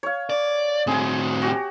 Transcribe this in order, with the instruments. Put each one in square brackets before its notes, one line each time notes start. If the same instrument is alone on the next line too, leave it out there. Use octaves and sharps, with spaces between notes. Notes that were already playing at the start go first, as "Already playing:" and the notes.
[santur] C#5 F5
[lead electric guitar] D5
[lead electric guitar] A2 C4 [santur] G#4 G#5
[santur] F#4 G4